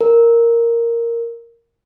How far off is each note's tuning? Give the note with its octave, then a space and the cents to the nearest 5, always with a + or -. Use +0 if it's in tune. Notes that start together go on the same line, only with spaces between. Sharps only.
A#4 -5